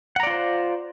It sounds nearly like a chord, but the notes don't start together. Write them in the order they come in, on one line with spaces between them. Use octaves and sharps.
F#5 A#5 D5 F4 C5